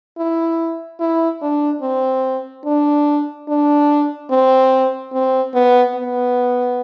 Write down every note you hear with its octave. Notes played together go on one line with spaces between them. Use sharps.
E4
E4
D4
C4
D4
D4
C4
C4
B3
B3